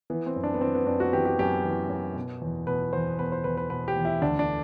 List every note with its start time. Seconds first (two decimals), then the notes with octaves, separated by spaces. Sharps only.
0.10 E3 B3
0.26 C4
0.36 F#2
0.44 D4
0.54 B3
0.61 E3 C4
0.74 B3
0.86 F#2 D4
1.00 F#4
1.13 E3 G4
1.25 G4
1.39 F#2 G4
1.65 E3
1.89 F#2
2.16 B2
2.42 E2
2.67 B2 B4
2.93 E2 C5
3.19 B2 B4
3.32 C5
3.44 E2 B4
3.57 B4
3.70 B2 B4
3.88 G4
3.96 E2
4.05 E4
4.22 D2 D4
4.39 D4